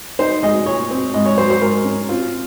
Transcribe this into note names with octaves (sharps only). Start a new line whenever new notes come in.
D#4 C5
G#3 D#5
A#2 C#5
C4
G#2 D#5
C#5
F#3 C5
C5
G#2 A#4
C#4
C4 F4